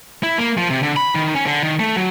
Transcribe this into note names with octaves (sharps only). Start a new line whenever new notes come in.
E4
A#3
F3
C3
D3
B5
D#3
C#4
D3
D#3
A3
F#3